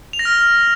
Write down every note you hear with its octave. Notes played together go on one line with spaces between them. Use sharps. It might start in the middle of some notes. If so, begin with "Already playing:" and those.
F7
A#6
F6